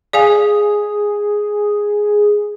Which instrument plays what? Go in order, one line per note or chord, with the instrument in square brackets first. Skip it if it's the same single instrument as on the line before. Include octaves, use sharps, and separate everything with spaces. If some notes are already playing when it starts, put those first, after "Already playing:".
[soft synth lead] G#4 [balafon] D5 F5 G#5 [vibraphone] D#6